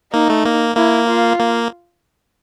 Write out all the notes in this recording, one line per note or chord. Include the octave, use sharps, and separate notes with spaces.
A#3 D#4
A3
A#3
A#3 E4
F4
A#3